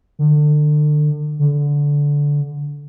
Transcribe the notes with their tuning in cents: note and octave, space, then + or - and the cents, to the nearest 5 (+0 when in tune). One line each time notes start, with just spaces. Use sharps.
D3 +30
D3 -15